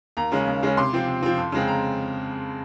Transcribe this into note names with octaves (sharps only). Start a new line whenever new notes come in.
D#2 A#5
C#3 G#3 C#4
D#2
C#3 G#3 C#4
C3 C6
F3 C4
C3
F3 C4
F2
C#3 G#3 C4
A#5